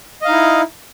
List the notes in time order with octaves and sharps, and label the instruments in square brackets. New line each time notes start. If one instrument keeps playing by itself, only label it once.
[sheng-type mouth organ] D#5
F5
D#4
E4